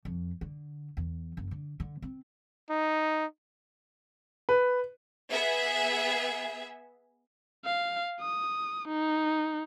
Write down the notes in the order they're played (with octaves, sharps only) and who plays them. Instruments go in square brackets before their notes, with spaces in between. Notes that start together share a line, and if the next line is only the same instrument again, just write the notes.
[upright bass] F2
D3
E2
F#1
D3
D3
C4
[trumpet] D#4
[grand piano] B4
[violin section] B3 G#4 E5
[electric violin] F5
D#6
D#4